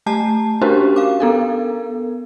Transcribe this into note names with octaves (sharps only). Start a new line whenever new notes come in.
A3 A5 A#5 C7
C#4 D4 F#4 G4 A#4 C5
F5 D6
B3 A4 A#4